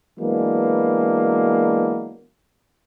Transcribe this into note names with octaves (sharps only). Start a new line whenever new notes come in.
E3 F#3 G#3 A#3 B3 D4